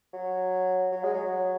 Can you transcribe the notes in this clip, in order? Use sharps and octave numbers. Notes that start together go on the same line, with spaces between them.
F#3
F#3
G#3
F#3